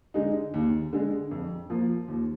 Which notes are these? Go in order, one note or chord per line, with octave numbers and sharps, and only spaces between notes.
D3 G#3 D#4
D#2
D3 G#3
F2
F3 A#3 F4
D#2